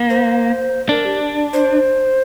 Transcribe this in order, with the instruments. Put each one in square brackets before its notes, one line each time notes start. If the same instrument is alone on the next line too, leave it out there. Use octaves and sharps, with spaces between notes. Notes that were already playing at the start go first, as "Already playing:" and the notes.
Already playing: [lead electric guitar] A#3
[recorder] C5
[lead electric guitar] D4 [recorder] A#4
[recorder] G4
C5